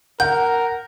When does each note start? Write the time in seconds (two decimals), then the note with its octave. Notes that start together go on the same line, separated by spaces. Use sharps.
0.20 A#4 F#5 G6